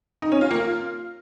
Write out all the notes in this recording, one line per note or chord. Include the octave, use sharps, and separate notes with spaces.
D#4
C#4
F4
A#3
F4